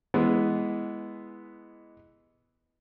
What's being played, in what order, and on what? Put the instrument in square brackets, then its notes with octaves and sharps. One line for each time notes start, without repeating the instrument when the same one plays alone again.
[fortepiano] E3 G#3 B3